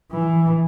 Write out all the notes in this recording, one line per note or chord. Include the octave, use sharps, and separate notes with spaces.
E3